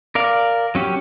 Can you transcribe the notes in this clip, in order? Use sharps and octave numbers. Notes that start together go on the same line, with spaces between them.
A#4 D5 F5
F#3 C#4 G4